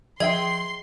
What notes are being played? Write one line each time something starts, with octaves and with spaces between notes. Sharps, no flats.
F3 G#4 D#5 E5 G5 C6 G#6